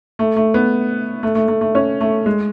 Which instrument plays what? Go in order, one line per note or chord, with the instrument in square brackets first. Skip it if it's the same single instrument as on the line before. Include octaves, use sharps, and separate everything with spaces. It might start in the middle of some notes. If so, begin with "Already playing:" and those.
[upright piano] A3
A3
B3
A3
A3
A3
A3
C#4
A3
G#3